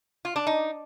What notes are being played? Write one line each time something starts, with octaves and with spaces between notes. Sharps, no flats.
F4
D4
D#4